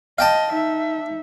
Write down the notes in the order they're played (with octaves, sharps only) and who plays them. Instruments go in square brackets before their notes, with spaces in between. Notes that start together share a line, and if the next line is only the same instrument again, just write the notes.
[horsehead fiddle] D#5 [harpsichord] F5 G5 A5
[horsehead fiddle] D#4 E5